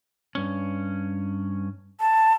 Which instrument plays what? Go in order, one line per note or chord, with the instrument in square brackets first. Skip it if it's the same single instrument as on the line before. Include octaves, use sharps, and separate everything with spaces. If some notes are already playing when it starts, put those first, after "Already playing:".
[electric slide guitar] G2 C#4
[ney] A5